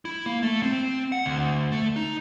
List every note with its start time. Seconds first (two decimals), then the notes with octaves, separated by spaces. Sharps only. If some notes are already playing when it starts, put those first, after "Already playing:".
0.05 E4
0.26 A#3
0.43 A3
0.63 C4
1.12 F#5
1.26 D2
1.72 A3
1.96 D#4